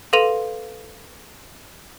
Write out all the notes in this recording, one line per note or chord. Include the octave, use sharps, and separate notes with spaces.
A4 B4 F5 C6 D#7 F7